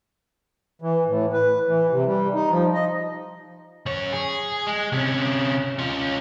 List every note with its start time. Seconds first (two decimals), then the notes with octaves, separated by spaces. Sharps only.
0.82 E3
1.06 A2
1.33 B4
1.66 E3
1.91 C3
2.06 G3
2.34 D#4
2.50 F3
2.74 D#5
3.86 F#2 C#5
4.13 G#4
4.67 G#3
4.92 C3 C#4
5.79 C#4 F4